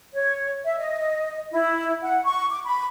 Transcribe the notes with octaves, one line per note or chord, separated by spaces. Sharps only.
C#5
E5
D#5
E4
F#5
C#6
D6
B5